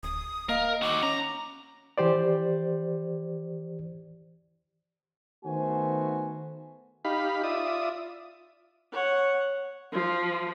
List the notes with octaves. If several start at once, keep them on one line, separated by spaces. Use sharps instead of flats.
D1 D#6
A#3 A#4 D#5 F5
D#3 F#4 D6
C#4 A#5
E3 G4 C5 D5
D#3 A3 B3 F#4 C5 G#5
D#4 G4 F5 B5
F4 D5 E5 D#6
C#5 F#5
F3